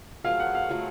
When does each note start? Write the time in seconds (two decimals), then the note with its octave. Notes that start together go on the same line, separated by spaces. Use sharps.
0.24 F#3 A3 F4 G#4 F5
0.40 F#5
0.55 F5
0.69 F#3 A3 F4 G#4